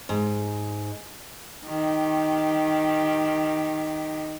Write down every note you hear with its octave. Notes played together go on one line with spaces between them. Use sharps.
G#2
D#3 G4